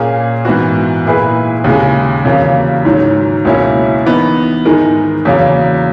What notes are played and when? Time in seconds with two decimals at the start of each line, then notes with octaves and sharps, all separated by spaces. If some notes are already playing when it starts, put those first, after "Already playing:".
Already playing: A#2 A#3 C#4 G#4
0.45 G#2 E3 B3 F#4
1.05 A#2 A#3 E4 G#4 B4
1.64 D#2 C#3 G#3
2.25 E2 C#3 F#3 A#3
2.85 G#2 D#3 F#3
3.45 C#2 B2 A#3 C#4 E4
4.05 E3 B3 D#4
4.65 G#2 D#3 G#3 D#4 A#4
5.25 E2 C#3 F#3 A#3